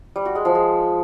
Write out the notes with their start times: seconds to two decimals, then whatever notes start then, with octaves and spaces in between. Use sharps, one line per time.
0.16 G3
0.25 F#4
0.35 G#3
0.45 F3
0.55 G#3